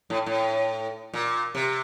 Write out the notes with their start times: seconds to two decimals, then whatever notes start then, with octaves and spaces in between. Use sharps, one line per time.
0.10 A2
0.26 A2
1.13 A#2
1.55 C3